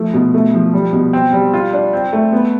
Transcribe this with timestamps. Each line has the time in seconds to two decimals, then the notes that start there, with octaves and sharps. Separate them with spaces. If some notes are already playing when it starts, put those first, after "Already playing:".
Already playing: F3 A3
0.14 B2
0.34 A3
0.54 F3
0.73 G3
0.93 B2
1.13 C4
1.33 G3
1.53 F4
1.73 D4
1.93 C4
2.13 A3
2.32 B3